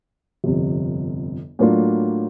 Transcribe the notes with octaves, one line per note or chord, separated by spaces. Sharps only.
G1 F2 C3
A2 F#3 A#3 D4 F4